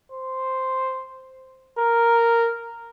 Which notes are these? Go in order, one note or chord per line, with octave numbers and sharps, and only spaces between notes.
C5
A#4